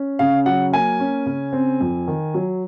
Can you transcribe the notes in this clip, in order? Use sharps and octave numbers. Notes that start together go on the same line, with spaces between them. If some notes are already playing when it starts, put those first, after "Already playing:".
Already playing: C#4
C#3 F5
F#3 F#5
A#3 G#5
C#4
C#3
C4
F2
D#3
F#3